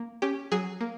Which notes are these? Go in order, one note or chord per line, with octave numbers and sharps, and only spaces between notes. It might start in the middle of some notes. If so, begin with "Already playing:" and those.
Already playing: A#3
C#4 G4
F#3 G#4
A#3